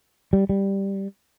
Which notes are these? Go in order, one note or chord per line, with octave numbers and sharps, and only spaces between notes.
G3
G3